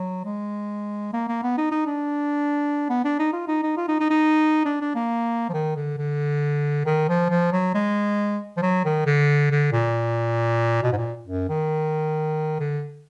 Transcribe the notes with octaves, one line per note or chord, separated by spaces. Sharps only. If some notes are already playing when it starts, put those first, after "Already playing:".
Already playing: F#3
G#3
A#3
A#3
B3
D#4
D#4
D4
B3
D4
D#4
F4
D#4
D#4
F4
D#4
D#4
D#4
D4
D4
A#3
F3
D#3
D3
D3
D#3
F3
F3
F#3
G#3
F3
F#3
D#3
D3
D3
A#2
B2
G#2
A#2
F#2
D#3
D3